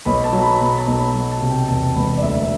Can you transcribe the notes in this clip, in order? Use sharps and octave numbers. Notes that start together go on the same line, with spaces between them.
B1 B5
A5
F#3
B5
B2 B5
A5
B1
B5
F#3 A5
A5
C3
G5
E2 A5
E1 B5
D5
D2 E5
E5